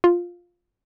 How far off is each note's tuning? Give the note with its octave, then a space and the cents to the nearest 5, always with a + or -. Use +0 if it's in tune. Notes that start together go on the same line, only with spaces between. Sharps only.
F4 +5